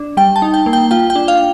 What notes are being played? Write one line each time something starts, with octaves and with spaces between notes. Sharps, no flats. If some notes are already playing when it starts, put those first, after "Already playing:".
Already playing: D4
G3 G5
A5
D#4
G5
A#3
G5
F4 G5
G5
D4
F5